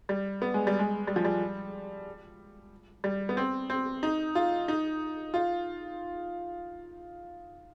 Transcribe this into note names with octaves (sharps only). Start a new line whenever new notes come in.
G3
B3
G#3
G3
G#3
G3
F3
G3
G3
B3
C4
C4
D#4
F4
D#4
F4